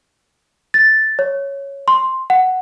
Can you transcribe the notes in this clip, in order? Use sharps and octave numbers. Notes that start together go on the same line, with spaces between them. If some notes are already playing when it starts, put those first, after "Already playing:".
A6
C#5
C6
F#5